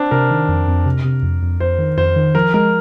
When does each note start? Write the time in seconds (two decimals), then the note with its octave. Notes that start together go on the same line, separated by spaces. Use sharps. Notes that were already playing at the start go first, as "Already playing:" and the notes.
Already playing: C4 D4
0.11 C3 A#4
0.31 D#3
0.48 F2
0.67 F2
0.86 C3
1.05 C3
1.23 F2
1.42 F2
1.60 F2 C5
1.78 D#3
1.98 F2 C5
2.16 D#3
2.35 F3 A#4
2.54 G#3 A#4